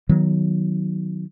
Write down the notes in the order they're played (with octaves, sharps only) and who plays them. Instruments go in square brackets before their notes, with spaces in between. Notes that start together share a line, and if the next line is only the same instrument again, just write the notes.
[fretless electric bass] D#3 F#3 B3